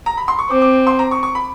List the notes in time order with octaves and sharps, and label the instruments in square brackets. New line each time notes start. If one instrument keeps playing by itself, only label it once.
[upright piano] A#5
B5
C6
C#6
[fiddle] C4 [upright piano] D6
[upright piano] D6
C6
A#5
C#6
C#6
B5